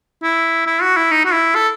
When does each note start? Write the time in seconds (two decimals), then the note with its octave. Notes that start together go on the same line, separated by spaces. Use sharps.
0.23 E4
0.67 E4
0.82 F#4
0.97 E4
1.11 D#4
1.25 F#4
1.33 E4
1.55 A4